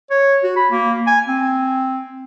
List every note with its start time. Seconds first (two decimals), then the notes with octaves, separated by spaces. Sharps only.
0.10 C#5
0.43 F#4
0.56 B5
0.71 A#3
1.07 G#5
1.28 C4